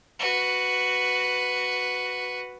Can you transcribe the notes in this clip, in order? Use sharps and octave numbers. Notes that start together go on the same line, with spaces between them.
F#4 B4